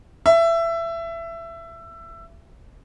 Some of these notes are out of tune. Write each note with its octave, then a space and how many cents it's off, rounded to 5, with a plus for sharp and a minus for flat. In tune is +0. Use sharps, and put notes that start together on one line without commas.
E5 +20